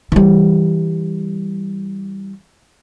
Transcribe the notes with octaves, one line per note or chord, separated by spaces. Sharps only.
E3 G3